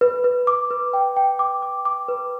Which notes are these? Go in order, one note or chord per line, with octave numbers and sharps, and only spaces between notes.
B4
B4
D6
B4
G5
G5
D6
D6
D6
B4